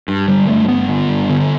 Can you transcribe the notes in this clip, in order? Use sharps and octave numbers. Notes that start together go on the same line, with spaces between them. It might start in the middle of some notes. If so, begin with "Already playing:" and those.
G2
D3 G3
G2 A3
G2 B3
D3
G2
D3